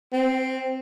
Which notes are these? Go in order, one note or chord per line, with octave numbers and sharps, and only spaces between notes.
C4